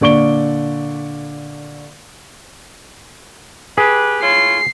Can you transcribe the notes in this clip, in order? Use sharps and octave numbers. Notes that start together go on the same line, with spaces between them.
A#2 D3 D5 C#6 D7 G7
G4 G#4 B4
E4 F4 C#5 C7